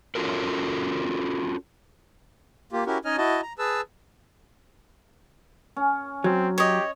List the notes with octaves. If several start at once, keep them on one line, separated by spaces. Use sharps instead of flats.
C#4 F4 F#4 A4 A#4
A#3 F4 G4
C#4 E4 F#4 G4 A#4
C#4 D#4 C#5 D#5 G#5 F6
E4 F#4 D#5 A5
A#5
G#4 B4 A5 E6
C#4
F#3 C4
G4 C#5 D#5